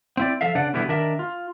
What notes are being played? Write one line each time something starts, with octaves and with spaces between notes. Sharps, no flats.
C4 E4 D5
F3 A4 E5 F5
C#3 D4 B4 D5 F#5
B2 D3 E3 G3 B3 E4
D#3 D4 A#4 E5
F4